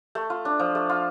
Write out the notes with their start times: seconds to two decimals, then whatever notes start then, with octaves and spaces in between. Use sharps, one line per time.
0.15 A3
0.30 F4
0.45 D4
0.59 F3
0.75 A3
0.89 F4